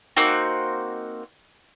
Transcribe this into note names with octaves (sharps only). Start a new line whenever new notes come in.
A#3 C4 D#4 F#4